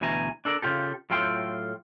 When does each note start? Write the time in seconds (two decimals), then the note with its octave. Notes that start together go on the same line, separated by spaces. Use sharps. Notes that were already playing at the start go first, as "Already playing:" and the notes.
0.01 D2 B2 E3 G#5 A#5
0.45 D4 A4 A#4 D5
0.62 C#3 E3 F4 G4 A4
1.10 A2 F#3 F4 A4 G5 C6